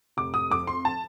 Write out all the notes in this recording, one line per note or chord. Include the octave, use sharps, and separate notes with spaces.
F1 D6
D#6
F2 D6
C6
A5